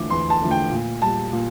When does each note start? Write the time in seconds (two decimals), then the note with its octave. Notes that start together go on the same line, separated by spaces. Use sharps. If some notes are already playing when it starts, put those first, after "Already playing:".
Already playing: E2 D3 F3 A3 D6
0.10 E2 C6
0.30 A5
0.41 D3 F3 A3
0.51 G5
0.71 A#2
1.02 G3 A5
1.33 A#2